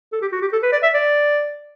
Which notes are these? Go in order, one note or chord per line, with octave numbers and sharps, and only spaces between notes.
A4
G4
F#4
G4
A4
B4
D5
E5
D5